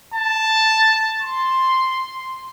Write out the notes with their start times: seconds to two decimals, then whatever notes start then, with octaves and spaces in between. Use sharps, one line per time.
0.14 A5
1.22 C6